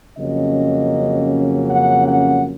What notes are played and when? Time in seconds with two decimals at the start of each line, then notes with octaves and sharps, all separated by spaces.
0.18 F2 C#3 F#3 A#3 C#4 D#5
1.71 F#5
2.08 F#5